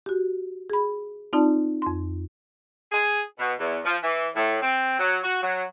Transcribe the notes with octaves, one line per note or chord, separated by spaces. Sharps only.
F#4 G4
G#4 B5
C4 D#4 F4 D5 A5
F2 C6
G#4
B2
E2
F3
E3
A2
C4
F#3
F#4
F#3